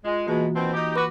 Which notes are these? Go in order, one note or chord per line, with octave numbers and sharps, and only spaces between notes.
G#3 F4
B2 E3 G#3 A#3 F#4
B2 D#3 C4
D#4 G4
F#4 B4 D6